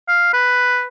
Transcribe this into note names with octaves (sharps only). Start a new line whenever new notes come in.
F5
B4